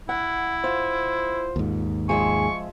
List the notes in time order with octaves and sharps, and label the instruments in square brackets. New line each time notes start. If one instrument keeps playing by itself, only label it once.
[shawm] E4 [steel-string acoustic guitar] F#5
[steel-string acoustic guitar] F4 [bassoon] C5
[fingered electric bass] D#2 G#2
[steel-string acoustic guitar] F3 G#3 E5 [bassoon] G#4 [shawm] C#6